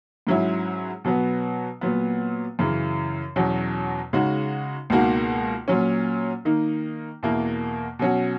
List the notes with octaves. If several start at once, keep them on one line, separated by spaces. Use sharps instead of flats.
G#2 F#3 C#4 E4
B2 F#3 B3
A#2 F#3 B3
F#2 C#3 E3
E2 B2 F#3 C#4
C#3 G#3 D#4 F#4
C#2 B2 A#3 D#4 F#4
A#2 F#3 C#4
D#3 A#3 D#4
E2 B2 A#3 E4
B2 F#3 C#4 F#4